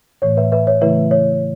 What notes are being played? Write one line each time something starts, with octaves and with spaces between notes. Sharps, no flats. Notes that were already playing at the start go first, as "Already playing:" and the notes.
A2 E3 A3 C#5
B4 E5
B4 E5
C#5
C#3 E3 A3 E4 B4 E5
C#5